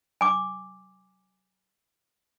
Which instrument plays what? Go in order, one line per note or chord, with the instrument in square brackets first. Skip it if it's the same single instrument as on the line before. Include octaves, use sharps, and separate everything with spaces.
[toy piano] G#5 D6